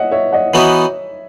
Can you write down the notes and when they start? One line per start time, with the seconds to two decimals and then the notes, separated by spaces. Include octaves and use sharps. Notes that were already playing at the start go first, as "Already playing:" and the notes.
Already playing: C#5 D#5 E5 F#5
0.11 C#5 E5
0.32 D#5 F#5
0.54 E3 B3 D#4 F#4 C#5 E5